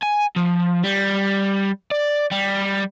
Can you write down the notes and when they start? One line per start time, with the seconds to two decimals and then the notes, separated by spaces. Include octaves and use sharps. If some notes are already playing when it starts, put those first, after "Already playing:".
0.02 G#5
0.36 F3
0.84 G3
1.91 D5
2.31 G3